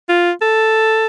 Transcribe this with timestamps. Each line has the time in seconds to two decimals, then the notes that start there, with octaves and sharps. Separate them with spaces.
0.09 F4
0.41 A4